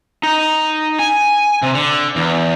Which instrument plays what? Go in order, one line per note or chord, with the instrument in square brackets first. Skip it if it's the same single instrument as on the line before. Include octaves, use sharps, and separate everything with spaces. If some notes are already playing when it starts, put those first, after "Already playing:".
[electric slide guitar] D#4
G#5
C3
D3
E2